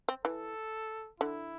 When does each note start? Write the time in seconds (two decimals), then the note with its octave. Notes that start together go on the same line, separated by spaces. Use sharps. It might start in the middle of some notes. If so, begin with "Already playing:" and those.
0.09 C4
0.25 E3 A4
1.20 D3 E4